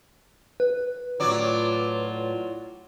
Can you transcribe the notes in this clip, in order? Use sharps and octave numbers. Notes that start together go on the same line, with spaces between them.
B4
A2 F#3 F4 D5